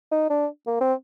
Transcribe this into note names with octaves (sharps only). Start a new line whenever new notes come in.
D#4
D4
A#3
C4